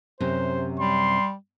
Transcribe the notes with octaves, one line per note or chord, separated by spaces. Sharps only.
F#2 C3 C#4 C5
G3 C6